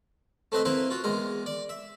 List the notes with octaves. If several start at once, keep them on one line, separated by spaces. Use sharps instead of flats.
A3 C4 B4 D#5 E5
A#3 C4 E4 B4 C5
F4 F#4
E2 G#3 A#4
D5
E5